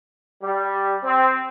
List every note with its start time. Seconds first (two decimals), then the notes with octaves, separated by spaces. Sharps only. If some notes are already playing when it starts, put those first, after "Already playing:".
0.43 G3
1.02 C4